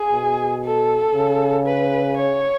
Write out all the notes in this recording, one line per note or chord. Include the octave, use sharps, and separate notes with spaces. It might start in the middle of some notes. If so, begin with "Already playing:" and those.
Already playing: G#4
B2
A4
C#3
B4
C#5